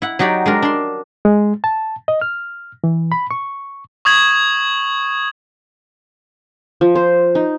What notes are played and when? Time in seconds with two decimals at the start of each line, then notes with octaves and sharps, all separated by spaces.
0.02 E4 F#5
0.19 F#3 D#4 F#4 G4 D5
0.46 G#3 D4 A#4
0.62 D4 C6
1.25 G#3
1.64 A5
2.08 D#5
2.21 F6
2.84 E3
3.12 B5
3.31 C#6
4.05 C#6 D#6 G#6 F#7
6.81 F3
6.95 C5
7.35 D#4